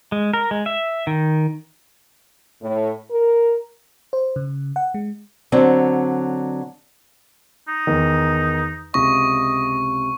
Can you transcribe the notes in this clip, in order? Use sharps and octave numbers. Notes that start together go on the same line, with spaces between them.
G#3
A#4
G#3
E5
D#3
A2
A#4
C5
C#3
F#5
G#3
D3 F#3 C4
D#4
E2 D#3
C#2 C3 D#5 C#6 A#6